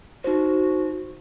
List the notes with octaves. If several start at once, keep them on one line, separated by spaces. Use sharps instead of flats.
D#4 F#4 C5